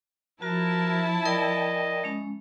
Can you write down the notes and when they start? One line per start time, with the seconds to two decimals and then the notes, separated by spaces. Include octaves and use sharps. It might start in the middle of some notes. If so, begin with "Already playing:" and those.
0.42 F3 E4 F#4 A#4 A5
1.25 A#4 D5 D#5 G5
2.04 G#3 C#4